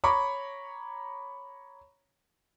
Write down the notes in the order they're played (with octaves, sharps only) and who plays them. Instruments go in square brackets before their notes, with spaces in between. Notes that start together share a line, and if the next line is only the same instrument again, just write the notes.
[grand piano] C#5 A#5 B5 C#6 D6